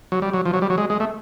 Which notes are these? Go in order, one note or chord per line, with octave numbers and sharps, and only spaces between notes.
F#3
G3
F#3
F3
F#3
G3
F#3
G#3
G#3
A3